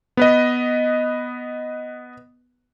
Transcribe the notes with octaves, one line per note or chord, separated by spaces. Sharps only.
B3 B4 D#5